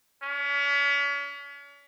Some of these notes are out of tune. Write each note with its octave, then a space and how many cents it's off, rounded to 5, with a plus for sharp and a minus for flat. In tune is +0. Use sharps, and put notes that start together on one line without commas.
C#4 +40